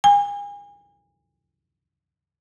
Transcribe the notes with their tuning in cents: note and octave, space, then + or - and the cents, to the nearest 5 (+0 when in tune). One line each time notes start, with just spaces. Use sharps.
G#5 -35